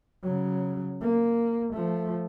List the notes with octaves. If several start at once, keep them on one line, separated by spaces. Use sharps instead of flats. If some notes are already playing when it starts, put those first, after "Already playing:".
C#3 F#3
A#3
F3 A3